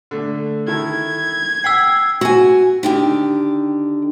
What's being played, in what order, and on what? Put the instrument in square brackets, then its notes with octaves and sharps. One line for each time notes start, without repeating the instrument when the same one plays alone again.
[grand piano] D3 A3
[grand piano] D#3 E4 A4 [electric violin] G#6
[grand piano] F#5 G5 B6 [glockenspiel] E6 C7
[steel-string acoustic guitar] F#4 G#5
D3 D#3 G4